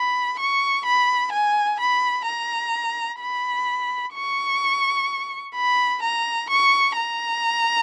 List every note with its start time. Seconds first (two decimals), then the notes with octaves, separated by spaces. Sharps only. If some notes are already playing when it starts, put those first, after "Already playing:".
Already playing: B5
0.39 C#6
0.85 B5
1.32 G#5
1.80 B5
2.26 A#5
3.21 B5
4.14 C#6
5.55 B5
6.02 A#5
6.50 C#6
6.96 A#5